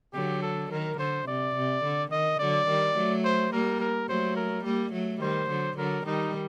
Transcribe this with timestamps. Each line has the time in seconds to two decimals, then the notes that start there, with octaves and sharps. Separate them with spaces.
0.14 D3 F#3 G4
0.42 A4
0.71 D#3 A#4
0.98 D3 C5
1.27 C3 D5
1.56 C3
1.84 D3
2.12 D#3 D#5
2.39 D3 F#3 D5
2.68 D#3 G3
2.96 F#3 A3
3.24 C5
3.52 G3 A#3 A#4
3.80 A#4
4.08 F#3 A3 C5
4.36 A#4
4.64 G3 A#3
4.93 F#3 A3
5.21 D#3 G3 C5
5.49 D3 F#3
5.77 D3 F#3 A#4
6.05 D#3 G3 D#4